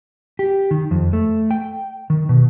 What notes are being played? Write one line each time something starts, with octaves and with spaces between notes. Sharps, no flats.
G4
D#3
F2
A3
G5
D#3
B2